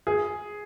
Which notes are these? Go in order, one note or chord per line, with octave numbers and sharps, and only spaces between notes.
G#4